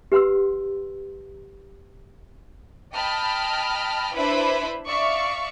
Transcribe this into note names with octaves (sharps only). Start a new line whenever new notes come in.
G4 B4 F#5 C6 E6
D#5 G5 A5 B5 F6
D4 E4 B4 C5 E5 B5
D5 E5 F5 C#6